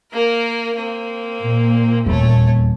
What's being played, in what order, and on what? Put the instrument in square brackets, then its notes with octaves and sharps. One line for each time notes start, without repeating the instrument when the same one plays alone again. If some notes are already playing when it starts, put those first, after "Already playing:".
[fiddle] A#3 A#4
A#3 C4
[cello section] A#2
[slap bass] D#1 E2 [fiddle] A3 C#5